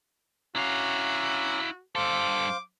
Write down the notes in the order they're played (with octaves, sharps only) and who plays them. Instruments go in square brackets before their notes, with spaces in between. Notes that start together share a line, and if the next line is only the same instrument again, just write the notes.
[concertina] C#4 A#5 D6 [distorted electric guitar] E4 F5 [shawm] F#4
[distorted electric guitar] G2 A4 [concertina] C5 F5 C6 [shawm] D6